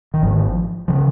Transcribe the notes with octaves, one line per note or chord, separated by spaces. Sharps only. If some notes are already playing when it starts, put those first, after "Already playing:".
D#3
G#1 G#2 F3
C#3 F3